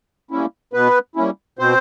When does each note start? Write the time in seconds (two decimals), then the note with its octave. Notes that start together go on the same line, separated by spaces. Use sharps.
0.31 G3 A#3 C#4 E4
0.73 B2 B3 B4
1.16 G3 A#3 C#4 E4
1.59 B2 C4 C5